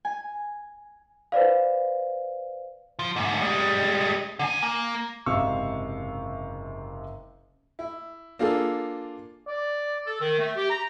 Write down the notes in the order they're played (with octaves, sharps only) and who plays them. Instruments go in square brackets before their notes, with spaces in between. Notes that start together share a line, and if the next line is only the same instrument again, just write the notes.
[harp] G#5
[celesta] B4 C5 D5 F5
[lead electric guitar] F3
D2 G#2
G3 G#3
D3 G#5
A#3
[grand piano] F#1 G#2 C3 F5 C#6 E6
[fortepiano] E4
A#3 D4 F4 G#4 A4
[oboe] D5
[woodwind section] A4
D#3
A3
G4
A#5